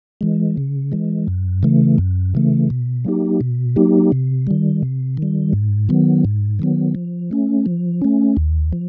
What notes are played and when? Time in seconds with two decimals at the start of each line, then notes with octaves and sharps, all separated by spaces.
0.21 E3 G#3
0.57 C#3
0.92 E3 G#3
1.28 F#2
1.63 C#3 E3 A3
1.98 F#2
2.35 C#3 E3 A3
2.70 B2
3.05 F#3 A#3 D#4 G4
3.41 B2
3.76 F#3 A#3 D#4 G4
4.12 C3
4.47 D#3 G3
4.83 C3
5.17 D#3 G3
5.53 G#2
5.89 D#3 F#3 B3
6.25 G#2
6.59 D#3 F#3 B3
6.95 F3
7.31 A3 C#4
7.66 F3
8.02 A3 C#4
8.37 D#2
8.73 F3